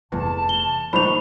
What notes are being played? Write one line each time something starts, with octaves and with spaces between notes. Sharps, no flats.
F1 E2 A3 A5
G7
A#1 D#3 G#3 A3 C5 B5 C#6 F7